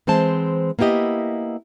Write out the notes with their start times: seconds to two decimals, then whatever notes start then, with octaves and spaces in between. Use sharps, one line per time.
0.07 E3 G#3 C4 C5 A5
0.79 A#3 B3 E4 G4 D#5